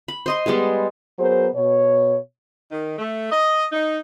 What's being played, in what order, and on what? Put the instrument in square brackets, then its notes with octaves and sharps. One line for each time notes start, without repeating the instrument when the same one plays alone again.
[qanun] B5
C5 D#5 C6
G3 G#3 B3 G#4
[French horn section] F#3 B3 G#4 A#4 C5
B2 C#5
[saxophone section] D#3
A3
D#5
D#4